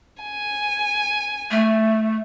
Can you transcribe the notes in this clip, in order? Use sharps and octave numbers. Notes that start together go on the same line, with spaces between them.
G#5
A3